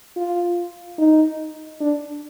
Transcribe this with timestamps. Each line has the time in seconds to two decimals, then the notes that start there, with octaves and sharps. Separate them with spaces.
0.17 F4
0.98 D#4
1.80 D4